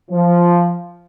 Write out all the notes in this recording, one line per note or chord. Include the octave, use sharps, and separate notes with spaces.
F3